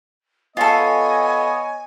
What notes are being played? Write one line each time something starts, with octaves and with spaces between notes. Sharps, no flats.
B3 F4 A4 C#5 D#5 G#5